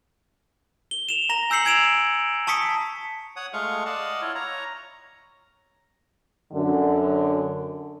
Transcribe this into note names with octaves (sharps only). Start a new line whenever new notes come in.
G7
E7 F7
A#5 A#6 F7
G#5 E6 G6 C7 C#7 F#7
G#5 G#6 D7 E7 F7
A5 C#6 D#6 B6 C#7
C#5 F#5 D#6
G#3 A3 F4 F5 C#6
D5 D#5 F5 F#5 A5
E4 F4 C#5
C#5 A#5
F#2 D3